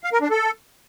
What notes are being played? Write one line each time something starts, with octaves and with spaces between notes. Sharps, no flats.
F5
A#4
D4
A4